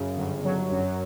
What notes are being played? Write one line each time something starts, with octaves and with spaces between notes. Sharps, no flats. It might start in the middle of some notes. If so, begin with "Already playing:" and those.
Already playing: F#2 C#3
G1
F#3
F#2